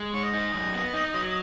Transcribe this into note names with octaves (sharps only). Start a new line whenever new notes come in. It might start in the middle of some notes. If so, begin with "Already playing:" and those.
Already playing: G#3
G#2 C#5
D#5
D#4
F#2
B3
D#4
F#3